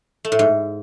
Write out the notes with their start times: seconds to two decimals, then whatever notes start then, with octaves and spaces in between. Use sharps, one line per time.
0.25 A3
0.32 A2
0.39 G#2